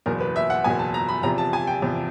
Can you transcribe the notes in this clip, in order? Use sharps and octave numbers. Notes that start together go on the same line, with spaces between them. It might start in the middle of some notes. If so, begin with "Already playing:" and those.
F#1 E2 B2 A#4
B4
E5
F#5
F#1 E2 B2 G#5
A5
A#5
B5
E2 C3 F3 A#5
A5
G#5
G5
E2 C3 F3